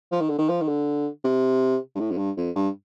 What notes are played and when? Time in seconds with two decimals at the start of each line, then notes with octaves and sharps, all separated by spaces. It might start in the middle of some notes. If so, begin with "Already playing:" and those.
0.12 F3
0.21 D#3
0.29 D3
0.39 D#3
0.49 F3
0.62 D#3
0.68 D3
1.24 C3
1.95 G2
2.00 A2
2.11 F2
2.18 G2
2.37 F2
2.56 G2